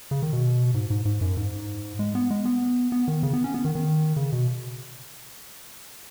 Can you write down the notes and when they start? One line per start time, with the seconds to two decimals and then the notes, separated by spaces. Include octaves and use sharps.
0.11 C#3
0.22 D#3
0.33 B2
0.74 G#2
0.90 G#2
1.05 G#2
1.21 F#2
1.37 G#2
1.99 G#3
2.15 B3
2.30 G#3
2.45 B3
2.92 B3
3.08 D#3
3.23 C#3
3.33 B3
3.44 C#4
3.54 B3
3.65 D#3
3.75 D#3
4.16 C#3
4.32 B2